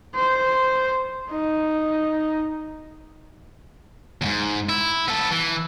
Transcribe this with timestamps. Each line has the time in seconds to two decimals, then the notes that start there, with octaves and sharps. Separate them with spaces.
0.15 C5
1.30 D#4
4.22 E2 G#2
4.69 E4
5.08 B3 A4
5.31 E3